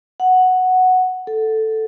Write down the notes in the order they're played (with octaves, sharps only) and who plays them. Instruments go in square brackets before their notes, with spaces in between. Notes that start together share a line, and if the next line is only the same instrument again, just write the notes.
[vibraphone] F#5
A4